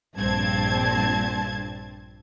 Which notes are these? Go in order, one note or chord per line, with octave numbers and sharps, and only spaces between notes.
A#1 G2 A#2 C4 A5 G#6